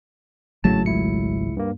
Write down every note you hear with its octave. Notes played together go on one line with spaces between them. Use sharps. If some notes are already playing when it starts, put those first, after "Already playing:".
G#1 A2 C#3 F#3 A3 A5
C#2 E4 C#7
G2 A#3